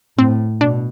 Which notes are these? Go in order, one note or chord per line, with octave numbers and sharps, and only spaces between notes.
A2 C4
B2 D4